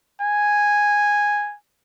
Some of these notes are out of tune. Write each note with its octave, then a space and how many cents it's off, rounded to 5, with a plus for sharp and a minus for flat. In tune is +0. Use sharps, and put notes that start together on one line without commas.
G#5 -5